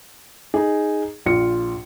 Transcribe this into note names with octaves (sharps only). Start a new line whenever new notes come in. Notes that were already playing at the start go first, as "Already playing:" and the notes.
D#4 G#4
A#1 F4 C#7